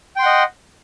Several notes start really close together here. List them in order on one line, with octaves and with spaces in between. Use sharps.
G5 C6 F#5 D#5